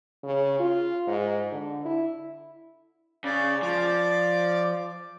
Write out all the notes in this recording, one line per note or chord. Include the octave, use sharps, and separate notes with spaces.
C#3
F4
G#2
D3
E4
C#3 D5
F3 D5 D6